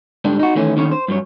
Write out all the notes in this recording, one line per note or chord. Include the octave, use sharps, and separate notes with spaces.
G#2 D3 G3 D4
D#4 F#4
D#3 E3 A3 C#4
D#2 D3 D#3 C#4 C#5
C5
G2 F#3 C#5